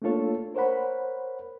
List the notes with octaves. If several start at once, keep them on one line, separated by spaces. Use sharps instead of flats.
A3 A#3 D4 F4 A4 C#5
A#4 C5 C#5 F#5 B5